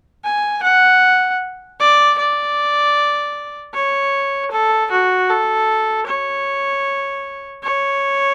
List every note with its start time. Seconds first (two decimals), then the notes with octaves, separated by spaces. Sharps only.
0.24 G#5
0.63 F#5
1.80 D5
2.18 D5
3.74 C#5
4.51 A4
4.91 F#4
5.29 A4
6.07 C#5
7.63 C#5